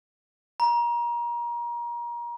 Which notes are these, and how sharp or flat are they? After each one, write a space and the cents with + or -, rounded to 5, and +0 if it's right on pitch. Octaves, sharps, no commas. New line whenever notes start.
A#5 +30